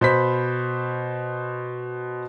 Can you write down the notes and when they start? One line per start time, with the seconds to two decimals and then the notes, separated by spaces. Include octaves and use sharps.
0.01 B2 C5 B5 B6